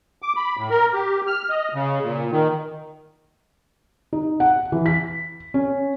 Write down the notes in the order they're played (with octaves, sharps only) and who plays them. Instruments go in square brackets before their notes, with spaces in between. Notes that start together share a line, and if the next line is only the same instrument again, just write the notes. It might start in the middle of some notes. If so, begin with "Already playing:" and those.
[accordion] D6
B5
A2
A#4
G4
F6
D#5
C#3
A#2
D#3
[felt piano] D#4
F#5
E3
B6
C#4